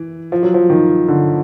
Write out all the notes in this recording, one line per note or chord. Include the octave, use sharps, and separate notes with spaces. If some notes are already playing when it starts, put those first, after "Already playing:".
Already playing: E3
F3
F#3
F3
D#3
D3